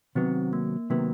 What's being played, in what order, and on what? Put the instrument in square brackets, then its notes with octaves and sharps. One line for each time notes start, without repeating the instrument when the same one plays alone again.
[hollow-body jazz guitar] C3 D#3 F#3 B3 [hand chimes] C4
[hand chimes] A#3
[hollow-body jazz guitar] C3 D#3 F#3 B3 [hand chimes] A#3